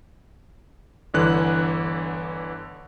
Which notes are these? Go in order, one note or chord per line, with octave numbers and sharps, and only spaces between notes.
G1 D3 E3 F#6